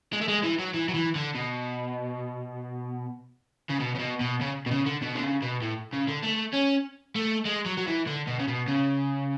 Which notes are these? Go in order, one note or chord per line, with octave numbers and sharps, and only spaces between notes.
G#3
A3
G#3
E3
F#3
E3
F#3
E3
D3
B2
C#3
B2
C#3
B2
B2
C#3
B2
C#3
D3
B2
D3
C#3
B2
A2
C#3
D3
A3
C#4
A3
G#3
F#3
F#3
E3
D3
B2
C#3
B2
C#3